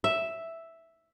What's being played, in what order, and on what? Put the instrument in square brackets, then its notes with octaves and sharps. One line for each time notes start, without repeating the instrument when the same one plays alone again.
[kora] E5